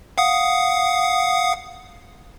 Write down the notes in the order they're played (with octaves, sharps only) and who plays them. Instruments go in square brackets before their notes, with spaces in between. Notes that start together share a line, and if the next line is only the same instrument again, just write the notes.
[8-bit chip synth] F5 F#5 D#6